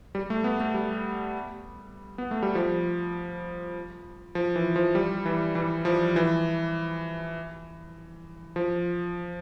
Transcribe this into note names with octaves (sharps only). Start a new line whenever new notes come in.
G3
A3
B3
A3
G3
B3
A3
G3
F3
F3
E3
F3
G3
E3
E3
F3
E3
F3